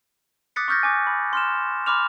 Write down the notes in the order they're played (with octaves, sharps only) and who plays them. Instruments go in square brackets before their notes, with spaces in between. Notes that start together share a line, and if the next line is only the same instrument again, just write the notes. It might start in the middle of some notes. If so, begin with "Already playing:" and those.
[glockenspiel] D6 D#6 F#6 A6 B6 C#7
C#6 D#6 F6 G6 A6 A#6
G#5 D6
B5
C6 F6 E7
B5 C6 D6 F6 F7